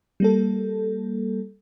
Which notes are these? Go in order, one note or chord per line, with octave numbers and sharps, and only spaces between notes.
G3 A#3 A4